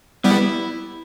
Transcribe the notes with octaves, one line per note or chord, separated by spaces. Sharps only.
G3 B3 E4